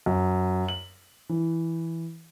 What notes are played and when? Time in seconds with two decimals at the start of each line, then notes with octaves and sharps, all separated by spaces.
0.06 F#2
0.68 F#7
1.29 E3